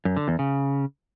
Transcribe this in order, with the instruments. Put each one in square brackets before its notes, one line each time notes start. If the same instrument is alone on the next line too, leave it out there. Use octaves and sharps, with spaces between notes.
[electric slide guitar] F#2
D3
E2
C#3